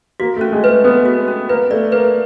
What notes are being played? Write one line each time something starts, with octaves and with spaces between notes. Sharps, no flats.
A#3 F#4
A3
C#4
G#3
A3 B4
B3 B4
F#4
C#4
A#3 B4
A3 D5
A#3 B4